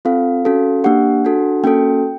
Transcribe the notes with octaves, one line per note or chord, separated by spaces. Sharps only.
C4 F4 A4 F5
C#4 F#4 A4
A#3 D4 G4 F#5
D4 F#4 A4
A#3 C#4 F#4 A4 G5